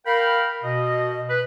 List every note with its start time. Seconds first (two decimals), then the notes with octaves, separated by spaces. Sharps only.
0.06 A#4 F5 G5 B5
0.64 B2 D#5
1.29 B4